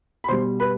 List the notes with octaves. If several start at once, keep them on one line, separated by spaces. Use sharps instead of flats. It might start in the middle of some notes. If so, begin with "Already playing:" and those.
B5
B2 G3 C5 C6
B4 B5